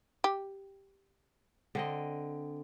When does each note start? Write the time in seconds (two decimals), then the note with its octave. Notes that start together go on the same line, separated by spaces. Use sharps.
0.24 G4
1.75 D3 C4 D#5